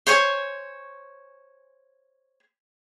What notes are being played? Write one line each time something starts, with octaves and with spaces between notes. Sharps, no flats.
C5 C#5 G#5 C#6